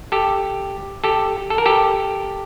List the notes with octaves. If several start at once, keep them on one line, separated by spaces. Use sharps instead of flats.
G4 A4
G4 A4
A4
A#4
G4 A4